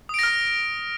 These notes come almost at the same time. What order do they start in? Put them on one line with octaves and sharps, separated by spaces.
D#6 D7 A#6 F6